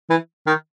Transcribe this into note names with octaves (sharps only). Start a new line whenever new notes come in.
E3
D#3